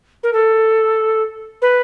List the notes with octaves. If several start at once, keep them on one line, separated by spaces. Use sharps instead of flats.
A#4
A4
B4